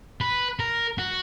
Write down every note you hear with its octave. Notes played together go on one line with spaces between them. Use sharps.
B4
A#4
F#4